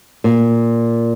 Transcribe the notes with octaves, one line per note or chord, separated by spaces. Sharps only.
A#2